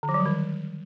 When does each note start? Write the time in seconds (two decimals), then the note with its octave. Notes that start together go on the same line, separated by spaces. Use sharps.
0.03 D3
0.09 F3
0.14 F#3
0.20 G3
0.26 D#3